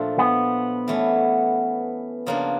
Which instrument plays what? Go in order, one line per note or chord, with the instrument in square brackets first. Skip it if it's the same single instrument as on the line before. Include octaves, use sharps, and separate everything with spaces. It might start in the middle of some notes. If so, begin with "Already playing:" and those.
Already playing: [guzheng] A#2 F3 A3 D4 F4
[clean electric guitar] B3
[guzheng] E3 A3 C#4
C#3 F3 A#3 D4